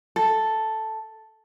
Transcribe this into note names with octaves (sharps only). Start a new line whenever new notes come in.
A4